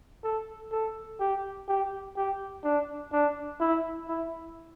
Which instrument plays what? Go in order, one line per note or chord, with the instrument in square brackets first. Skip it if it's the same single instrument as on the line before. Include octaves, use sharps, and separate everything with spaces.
[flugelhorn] A4
A4
G4
G4
G4
D4
D4
E4
E4